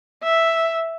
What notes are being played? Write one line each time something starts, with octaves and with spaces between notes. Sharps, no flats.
E5